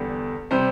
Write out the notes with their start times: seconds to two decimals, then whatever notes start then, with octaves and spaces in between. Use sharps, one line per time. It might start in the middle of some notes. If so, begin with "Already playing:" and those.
Already playing: E2 D3 G3
0.51 C3 G3 C5